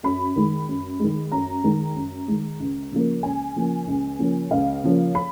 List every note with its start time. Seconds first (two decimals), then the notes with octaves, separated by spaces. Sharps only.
0.03 F#2 B5
0.36 D#3 G#3
0.68 F#2
1.00 D#3 G#3
1.32 F#2 A#5
1.64 D#3 G#3
1.96 F#2
2.28 D#3 G#3
2.60 C#2
2.92 C#3 F3 A#3
3.23 C#2 G#5
3.56 C#3 F3 A#3
3.88 C#2
4.19 C#3 F3 A#3
4.51 C#2 F5
4.84 C#3 F3 A#3
5.15 B5